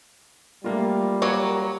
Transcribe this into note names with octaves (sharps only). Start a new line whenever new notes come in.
G3 A3 A#3 F4
F#3 A#3 F#4 C#5